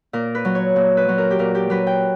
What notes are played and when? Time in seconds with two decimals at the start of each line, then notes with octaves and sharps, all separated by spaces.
0.13 A#2 A#4
0.35 B4
0.45 F#3
0.55 C#5
0.76 A#2
0.97 B4
1.08 F#3
1.18 A#4
1.31 G4
1.39 A#2 A#4
1.55 G4
1.70 F#3 B4
1.87 G5